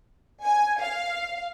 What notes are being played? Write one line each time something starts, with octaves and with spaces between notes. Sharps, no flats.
G#5
F5